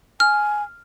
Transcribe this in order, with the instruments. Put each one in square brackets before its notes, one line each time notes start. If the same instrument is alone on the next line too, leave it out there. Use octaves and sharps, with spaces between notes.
[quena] G#5 [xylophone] F6